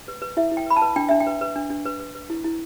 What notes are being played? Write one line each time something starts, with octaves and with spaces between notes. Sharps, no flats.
B4
B4
E4 E5
E4
G5
B4 B5
A5
B4
D4 G5
D4 E5
G5
B4
B4
D4
D4
B4
B4
B4
E4
E4